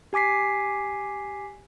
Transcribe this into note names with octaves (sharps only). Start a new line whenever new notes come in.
G4 G#5 D6 B6 C7